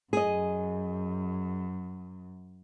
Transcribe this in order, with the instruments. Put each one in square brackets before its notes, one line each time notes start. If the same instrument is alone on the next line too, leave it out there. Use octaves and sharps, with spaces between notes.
[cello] F#2 [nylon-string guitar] G#4 D#5